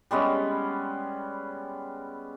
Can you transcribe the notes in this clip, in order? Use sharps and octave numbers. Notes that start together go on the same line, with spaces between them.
G3 G#3 B3 C#4